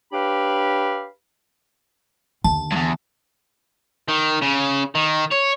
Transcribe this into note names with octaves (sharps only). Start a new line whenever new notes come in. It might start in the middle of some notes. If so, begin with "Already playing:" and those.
D4 G4 B4 C#5 F5 B5
D#2 D3 A5
E2 G2
D#3
C#3
D#3
C#5